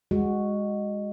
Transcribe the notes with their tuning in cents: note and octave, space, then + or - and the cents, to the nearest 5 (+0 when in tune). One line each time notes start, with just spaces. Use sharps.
G#3 -15 F#4 +0